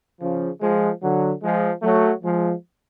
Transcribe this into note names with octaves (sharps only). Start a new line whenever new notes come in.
C#3 F3
F3 G#3
D3 F#3
F3 G#3
F#3 A3
F3 G#3